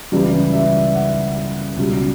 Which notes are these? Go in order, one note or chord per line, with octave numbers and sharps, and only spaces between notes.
C#2 C#3 E3 G3 D5
E5
F#5
C#2 B2 G3